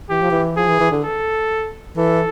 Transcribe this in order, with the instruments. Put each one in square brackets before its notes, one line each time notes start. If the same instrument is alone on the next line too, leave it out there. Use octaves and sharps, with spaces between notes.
[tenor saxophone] E3 [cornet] G4
[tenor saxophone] F3
E3
[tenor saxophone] F3 [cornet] G#4
[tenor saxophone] E3
E3
D3
[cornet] A4
[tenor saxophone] E3 [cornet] A4